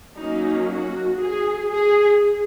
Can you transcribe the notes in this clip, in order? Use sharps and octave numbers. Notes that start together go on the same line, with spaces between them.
F#3 A#3 C#4 D#4
F#4
G#4
G#4